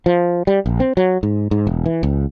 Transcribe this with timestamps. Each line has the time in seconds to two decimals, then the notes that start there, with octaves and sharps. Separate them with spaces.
0.06 F3
0.47 G3
0.66 A#1
0.80 C4
0.97 F#3
1.23 G#2
1.51 G#2
1.67 E1
1.86 E3
2.03 C#2